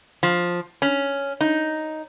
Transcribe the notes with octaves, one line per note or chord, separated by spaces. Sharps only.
F3
C#4
D#4